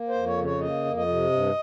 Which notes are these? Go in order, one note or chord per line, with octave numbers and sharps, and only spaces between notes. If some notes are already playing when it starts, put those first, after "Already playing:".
Already playing: A#3
C5
F2
C#5
C#3
C#5
A#3 D#5
F2
D#5
C3
G2